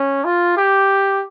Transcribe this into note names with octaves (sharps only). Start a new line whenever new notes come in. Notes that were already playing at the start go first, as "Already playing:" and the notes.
Already playing: C#4
F4
G4